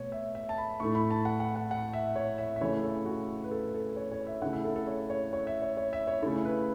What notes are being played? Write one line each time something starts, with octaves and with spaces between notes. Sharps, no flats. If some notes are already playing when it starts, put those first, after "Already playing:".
Already playing: B2 A3 C#5
E5
E5
A5
B5
A2 A3 E4 C#6
B5
A5
F#5
F#5
F#5
F#5
E5
C#5
E5
E5
C#3 E3 A3 E4 C#5
A4
F#4
B4
A4
A4
C#5
C#5
E5
C#3 A3 E4 F#5
E5
A4
A4
C#5
C#5
C#5
E5
C#5
C#5
E5
C#5
C#3 A3 E4 A4
B4